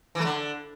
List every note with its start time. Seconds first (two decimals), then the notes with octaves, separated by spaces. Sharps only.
0.15 E3
0.20 A3
0.25 D3